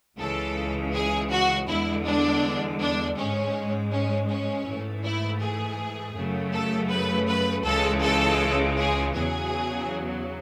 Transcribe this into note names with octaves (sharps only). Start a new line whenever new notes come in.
C#2 C#3 E3 G#3 A4
G#4
F#4
E2 D3 G#3 E4
D4
D4
G#2 G#3 C#4
C#4
C#4
G#2 E3 A3
E4
G#4
F#2 C#3 F#3 A3
A4
B4
B4
C#2 C#3 E3 G#3 A4
A4
G#4
E2 C#3 F#3 G#4